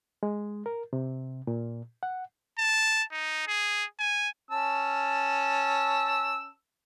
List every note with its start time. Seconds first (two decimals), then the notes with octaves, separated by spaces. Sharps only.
0.23 G#3
0.66 A#4
0.93 C3
1.47 A#2
2.03 F#5
2.58 A5
3.12 D#4
3.47 G#4
3.99 G#5
4.51 C#4 A5 E6